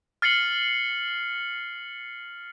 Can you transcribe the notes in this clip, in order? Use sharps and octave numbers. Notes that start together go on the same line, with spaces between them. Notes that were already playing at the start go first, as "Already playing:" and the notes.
F6 A6 C7 C#7 F#7